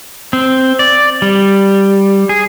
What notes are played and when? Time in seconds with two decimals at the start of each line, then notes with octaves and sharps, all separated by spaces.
0.33 C4
0.79 D5
1.22 G3
2.29 G#4